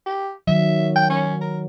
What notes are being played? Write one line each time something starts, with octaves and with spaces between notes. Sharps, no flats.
G4
D#3 F#3 E5
G5
C#4
A#4